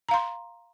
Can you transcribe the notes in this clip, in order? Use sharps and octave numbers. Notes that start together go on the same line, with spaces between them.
F5 A#5 C6